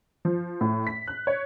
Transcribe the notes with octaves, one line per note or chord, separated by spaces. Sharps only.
F3
A2
B6
F#6
C#5